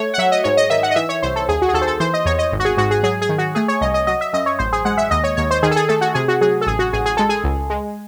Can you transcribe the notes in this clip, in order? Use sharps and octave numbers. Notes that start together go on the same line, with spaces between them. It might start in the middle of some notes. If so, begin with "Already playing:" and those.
Already playing: A3 C#5
F#5
F#3 E5
D#5
G#2 C#5
D#5
D#3 E5
F#5
D#5
E3 E5
C#5
C2 C5
A4
D#2 G#4
F#4
G#4
D#2 A4
C5
A4
E3 C5
D#5
E2 C#5
D#5
G#1
F#4
G#4
G#2 F#4
G#4
F#3 G#4
G#4
D#3
F#4
A3 G#4
C#5
C2 D#5
D#5
F#3 D#5
E5
F#2 D#5
C#5
A1 C5
G#4
G#3 F#5
E5
D#2 D#5
C#5
D#2 C#5
C5
D#3 G#4
A4
G#4
A3 A4
F#4
C3 G#4
F#4
F#3 G#4
A4
A1 G#4
F#4
A1 G#4
G#4
G#3 A4
G#4
C#2
G#3